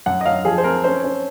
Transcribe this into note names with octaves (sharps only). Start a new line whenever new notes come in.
F#2 F#5
D#5
F#3 F5
F3 G#4
C5
C4 A#4
C#4 C5
C#4